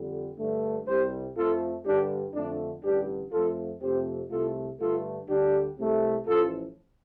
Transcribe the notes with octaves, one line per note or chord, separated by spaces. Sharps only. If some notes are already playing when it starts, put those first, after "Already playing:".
Already playing: F2 D3 G3
G2 D3 A3
C2 C3 G3 G4 C5
F2 F3 A3 F4 A4
G2 D3 G3 D4 G4
F2 D3 A3 D4
A1 G2 D3 D4 G4
F2 F3 A3 F4 A4
F2 C3 A3 G4 C5
C2 C3 A3 F4 A4
G2 D3 A3 F4 A4
D2 D3 G3 D4 G4
C2 C3 A3
A1 A2 F3 F4 A4